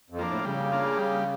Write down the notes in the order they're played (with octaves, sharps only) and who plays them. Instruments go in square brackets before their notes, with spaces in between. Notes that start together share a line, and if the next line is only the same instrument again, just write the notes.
[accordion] F2
[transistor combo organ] F3 A#3 D4
[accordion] A2
[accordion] C#3 [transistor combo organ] G3
[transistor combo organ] A#3 D4 F4
G3